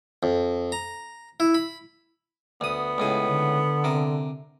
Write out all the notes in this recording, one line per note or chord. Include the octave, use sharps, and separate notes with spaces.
F2
A#5
E4
B5
D2 B3 D#6
C#2 A2 G#4
D3
C3 A#4